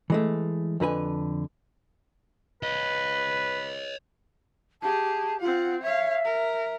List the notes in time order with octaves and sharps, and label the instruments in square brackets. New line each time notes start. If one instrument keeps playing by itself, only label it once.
[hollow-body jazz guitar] E3 G#3 A3
F2 D3 B4 G#5
[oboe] B4 [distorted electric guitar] C#5 D#5
[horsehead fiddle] G4 G#4 [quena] A5
[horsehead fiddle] C4 F#5 [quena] F4
[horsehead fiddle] C#5 F5 [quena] E5
[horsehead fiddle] A#4